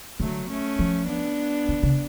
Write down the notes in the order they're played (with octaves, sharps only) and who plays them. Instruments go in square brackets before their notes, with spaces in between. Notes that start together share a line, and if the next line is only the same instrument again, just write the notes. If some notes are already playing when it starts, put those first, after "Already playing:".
[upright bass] D3 [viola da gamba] F#3 A3
[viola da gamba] A3 C#4
[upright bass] F3
[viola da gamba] B3 D4
[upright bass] D3
C#3